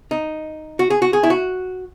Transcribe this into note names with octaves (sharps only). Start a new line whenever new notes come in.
D#4
F#4
G#4
F#4
G#4
E4
F#4